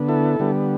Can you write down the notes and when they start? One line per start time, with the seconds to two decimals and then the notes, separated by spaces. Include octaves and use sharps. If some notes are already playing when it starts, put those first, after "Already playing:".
Already playing: D3 B3
0.08 E4 A4
0.40 D3 G3 B3